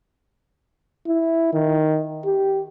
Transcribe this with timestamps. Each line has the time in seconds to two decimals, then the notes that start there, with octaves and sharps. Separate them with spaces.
1.08 E4
1.53 D#3
2.26 G4